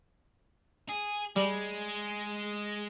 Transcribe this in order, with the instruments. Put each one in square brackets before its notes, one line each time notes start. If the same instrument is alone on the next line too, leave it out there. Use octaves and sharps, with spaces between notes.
[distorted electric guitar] G#4
[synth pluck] G3 [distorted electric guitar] G#3